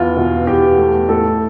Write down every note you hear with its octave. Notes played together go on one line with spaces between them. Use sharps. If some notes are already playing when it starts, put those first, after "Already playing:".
Already playing: E2 F4
B2
E2 G4
A3
A2 A4